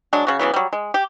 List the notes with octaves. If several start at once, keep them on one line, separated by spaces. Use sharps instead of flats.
F#3 G#3 D4
C#3 F#4
C#3 E3 F#3 B3
F#3 G3
G#3
G4